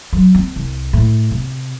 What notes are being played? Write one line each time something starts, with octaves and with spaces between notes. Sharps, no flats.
F#3
C4
C2
A2
C3